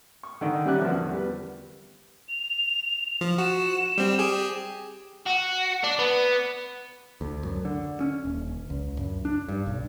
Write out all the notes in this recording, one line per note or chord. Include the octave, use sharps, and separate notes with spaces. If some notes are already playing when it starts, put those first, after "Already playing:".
C#6
D3 D#3 D5 D#5
G3 C#4 G4 E5 D6 F#6
D3 F3 B3 D4 F#4 A#4
E2
G3 B4
F7
F3
F#4 E7
G3 C4
G4 G#4
F#4
D4
B3
D2
F#2
D3
C#4
D#1
C#2
F#2
D4
G2
B1